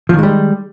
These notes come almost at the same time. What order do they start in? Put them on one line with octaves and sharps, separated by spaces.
F3 D#3 G#3 G3